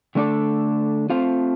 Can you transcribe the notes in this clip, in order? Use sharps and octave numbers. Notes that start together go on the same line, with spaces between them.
D3 A3 D4 A4 D5
A3 C4 F4 C5 F5